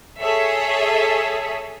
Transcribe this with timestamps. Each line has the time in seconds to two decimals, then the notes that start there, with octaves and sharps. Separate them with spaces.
0.21 G#4 A4 C#5 E5